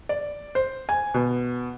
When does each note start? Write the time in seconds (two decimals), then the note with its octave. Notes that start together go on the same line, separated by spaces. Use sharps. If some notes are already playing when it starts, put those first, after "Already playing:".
0.09 D5
0.55 C5
0.89 G#5
1.14 B2